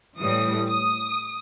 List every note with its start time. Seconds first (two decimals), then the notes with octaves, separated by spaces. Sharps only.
0.18 A2 E3 G3 D#6
0.68 D#6